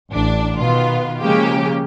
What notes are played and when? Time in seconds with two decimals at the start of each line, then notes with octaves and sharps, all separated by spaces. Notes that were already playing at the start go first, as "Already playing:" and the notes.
0.12 A1 D4
0.60 B2 D#3 B3 F4
1.22 C#3 F3 G#3 A#3 C#4 G4